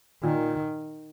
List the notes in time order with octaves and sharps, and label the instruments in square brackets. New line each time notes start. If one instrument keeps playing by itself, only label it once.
[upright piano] A#2 [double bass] D#3